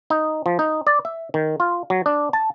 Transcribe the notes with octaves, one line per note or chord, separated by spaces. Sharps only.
D#4
F3
D#4
D5
E5
D#3
F4
F#3
D4
A5